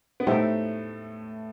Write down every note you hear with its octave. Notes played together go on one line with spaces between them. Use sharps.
B3
A2 A3 D#4 G4 C5 E5 G5